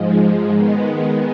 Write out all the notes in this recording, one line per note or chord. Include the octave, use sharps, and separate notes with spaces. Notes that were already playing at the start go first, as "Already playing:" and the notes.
Already playing: G#2 F3 G#3
D#3 G#3 B3